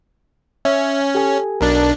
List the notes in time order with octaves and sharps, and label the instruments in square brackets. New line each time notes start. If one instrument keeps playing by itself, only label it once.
[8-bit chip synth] C#4 [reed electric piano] E5
[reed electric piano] G4 A4 G#5
[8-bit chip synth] B1 D4 [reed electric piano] A#4